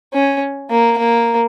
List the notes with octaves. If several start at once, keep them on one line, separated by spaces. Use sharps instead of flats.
C#4
A#3
A#3